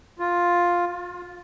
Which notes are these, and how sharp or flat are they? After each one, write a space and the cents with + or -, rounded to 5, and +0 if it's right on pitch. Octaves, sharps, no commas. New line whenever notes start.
F4 +5
F4 +35